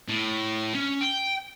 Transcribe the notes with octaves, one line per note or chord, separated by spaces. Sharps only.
A2
C#4
G5